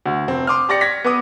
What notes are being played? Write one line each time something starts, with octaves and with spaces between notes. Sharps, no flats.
D2
F1 C4
C6 D6 D#6 F6
G4 D5 A#6 C#7
G#6 A#6 B6
B3 B4 D6 D#6